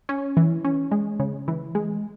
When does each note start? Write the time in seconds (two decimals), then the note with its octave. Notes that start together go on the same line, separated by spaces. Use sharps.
0.09 C#4
0.37 E3
0.64 C#4
0.91 G#3
1.19 C#3
1.48 E3
1.75 G#3